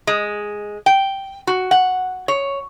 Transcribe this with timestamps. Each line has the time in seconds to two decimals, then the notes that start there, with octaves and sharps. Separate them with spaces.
0.07 G#3
0.86 G5
1.47 F#4
1.71 F#5
2.28 C#5